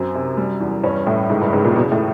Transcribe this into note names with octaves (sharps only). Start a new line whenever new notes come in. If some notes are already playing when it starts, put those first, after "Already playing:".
Already playing: F#2 C4
C3
G3
E2
G2 C#4
A2 E4
G#2 C#3
G2
G#2 C#3
A#2
E2 B2
A2